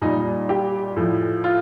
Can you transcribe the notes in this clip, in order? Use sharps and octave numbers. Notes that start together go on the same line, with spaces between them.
A#2 G3 D#4
G4
A2 F3
F4